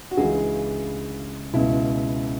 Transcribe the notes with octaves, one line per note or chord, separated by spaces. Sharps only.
F#4
C#2 C#3 E3 G#4
C#2 B2 E4